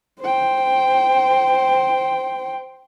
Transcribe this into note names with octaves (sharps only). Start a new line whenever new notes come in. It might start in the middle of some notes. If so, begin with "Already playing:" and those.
C5 G5